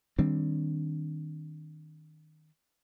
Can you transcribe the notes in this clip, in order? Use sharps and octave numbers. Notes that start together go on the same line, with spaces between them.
D#3 G3 C4 D4